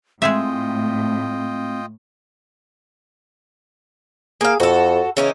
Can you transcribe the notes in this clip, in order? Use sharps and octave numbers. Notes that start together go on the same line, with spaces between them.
A2 G#3 C4 F4 G#4 D#5 E5 G5
A#3 G#4 F5
F2 F#4 A4
C#3 E3 C#4 D#4